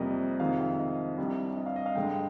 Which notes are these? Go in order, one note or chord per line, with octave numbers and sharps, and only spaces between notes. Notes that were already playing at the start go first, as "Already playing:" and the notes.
Already playing: F2 C3 G3 A#3 D#5
F2 C3 D#3 G#3 F5
F5
D#5
C2 C3 G3 D4
D#5
F5
D#5
F5
G2 D3 G#3 G5